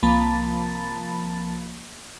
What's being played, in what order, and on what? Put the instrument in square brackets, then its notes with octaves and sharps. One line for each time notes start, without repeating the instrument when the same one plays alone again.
[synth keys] C2 F3 A#3 A5 B5 A6